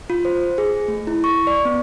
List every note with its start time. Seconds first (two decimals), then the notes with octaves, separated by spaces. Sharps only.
0.10 F4
0.25 C5
0.58 G#4
0.88 A3
1.07 E4
1.24 C#6
1.47 D5
1.65 B3